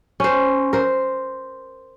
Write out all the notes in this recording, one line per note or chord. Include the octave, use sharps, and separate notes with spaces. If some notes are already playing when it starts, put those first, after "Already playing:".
C#4 C5
A#4 C5